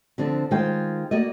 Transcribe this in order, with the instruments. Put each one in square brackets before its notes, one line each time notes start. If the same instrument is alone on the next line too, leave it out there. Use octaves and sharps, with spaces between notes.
[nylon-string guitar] D3 F3 C4 D4
D#3 G#3 F4 C5 G5
A#3 F#4 D5 D#5